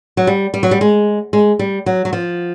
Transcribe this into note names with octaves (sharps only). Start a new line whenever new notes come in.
F#3
G3
G3
F#3
G3
G#3
G#3
G3
F#3
F#3
F3